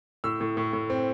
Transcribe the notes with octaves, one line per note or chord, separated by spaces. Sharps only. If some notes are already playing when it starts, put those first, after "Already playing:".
A2 E6
A2
A2
A2
C4